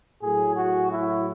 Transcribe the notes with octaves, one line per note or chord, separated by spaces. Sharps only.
A2 F#3 G#4
F#4
E4